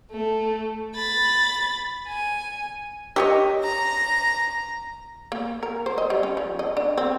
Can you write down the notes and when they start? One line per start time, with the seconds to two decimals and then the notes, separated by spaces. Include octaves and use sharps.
0.11 A3
0.96 B5 A6
2.09 G#5
3.16 G4 C#5 D#5
3.62 A#5 A#6
5.32 A#3
5.63 A#4
5.86 C5
5.98 D#5
6.10 G3
6.23 C#4
6.37 F3
6.59 D#5
6.77 D4
6.97 C4